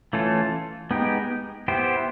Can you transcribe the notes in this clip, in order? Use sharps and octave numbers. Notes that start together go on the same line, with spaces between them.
E3 A3 C#4 F4 A4
G#3 B3 D#4 G4
B3 E4 G4 C5